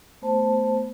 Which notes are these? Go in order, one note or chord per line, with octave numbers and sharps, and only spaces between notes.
A3 B3 C5 A5